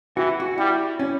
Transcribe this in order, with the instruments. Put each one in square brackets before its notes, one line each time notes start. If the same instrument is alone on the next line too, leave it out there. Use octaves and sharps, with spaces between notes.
[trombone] E3 [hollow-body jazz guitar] F#4
[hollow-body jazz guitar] F#4
[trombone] G3 [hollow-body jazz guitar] E4
[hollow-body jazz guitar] C#4